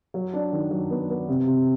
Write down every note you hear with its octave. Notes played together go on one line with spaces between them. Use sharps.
F#3
D4
D#3
F#3
B3
B3
C3
C3